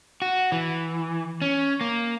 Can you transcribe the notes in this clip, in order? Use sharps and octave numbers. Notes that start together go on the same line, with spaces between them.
F#4
E3
C#4
A#3